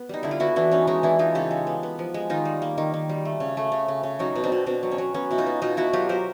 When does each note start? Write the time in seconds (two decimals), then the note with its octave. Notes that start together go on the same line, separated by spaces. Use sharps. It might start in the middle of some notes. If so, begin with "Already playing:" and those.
Already playing: B3
0.09 G3 D#4
0.23 D3 E4
0.31 F4
0.40 B3 E4 F#4
0.56 E3 D4 E4
0.72 B3 C#4 D#4
0.87 G#3 C#4 D#4
1.03 E3 D4 E4
1.19 G#3 D#4 F4
1.35 C#3 G4 A4
1.51 G#3
1.67 B3
1.83 B3
1.99 F3
2.14 G#3
2.30 D#3 D#4 F4
2.45 G3
2.62 A#3
2.78 D#3
2.94 D#3
3.09 G3
3.25 A3
3.40 C#3
3.57 A3
3.72 C#3
3.88 C#3
4.03 C#3
4.19 F#3 C#4 D#4
4.35 B2
4.44 C4 D4
4.52 B2
4.66 B2 C4 D4
4.83 F#3
4.91 C#4
4.98 F#3
5.14 B3 C#4
5.31 B2 E4
5.38 D#4 F4
5.46 B3
5.62 B2 D#4 F4
5.77 B3 E4 F#4
5.93 F#3 F4 G4
6.09 F#3 A#4 C5